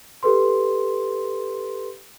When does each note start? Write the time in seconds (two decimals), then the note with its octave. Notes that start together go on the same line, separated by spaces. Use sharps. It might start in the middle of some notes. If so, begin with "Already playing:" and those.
0.23 G4 A4 B4 C6